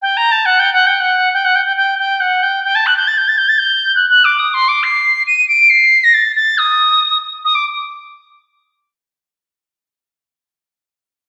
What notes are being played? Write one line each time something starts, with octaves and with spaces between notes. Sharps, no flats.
G5
A#5
A5
F#5
G5
F#5
G5
F#5
G5
F#5
G5
G5
G5
G5
F#5
G5
G5
A5
F#6
G6
A6
G6
A6
G6
A6
G6
F#6
F#6
D6
D#6
C6
D6
C7
D#7
D7
C7
A#6
A6
A6
D#6
D#6
D6